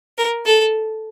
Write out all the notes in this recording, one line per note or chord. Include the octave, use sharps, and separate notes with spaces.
A#4
A4